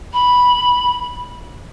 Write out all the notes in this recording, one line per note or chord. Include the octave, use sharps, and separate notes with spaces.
B5